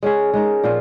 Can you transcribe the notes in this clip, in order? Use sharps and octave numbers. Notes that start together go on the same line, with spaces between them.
G#3 C#4 G#4
G#3 D#4 A#4
A#2 F3 C4 F4